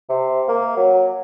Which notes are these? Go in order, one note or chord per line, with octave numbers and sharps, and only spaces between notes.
C3
A#3
F#3